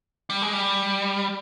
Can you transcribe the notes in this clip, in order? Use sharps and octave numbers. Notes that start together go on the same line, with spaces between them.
G3
G#3
G3